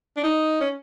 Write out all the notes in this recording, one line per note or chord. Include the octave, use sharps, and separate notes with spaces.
D4
D#4
C#4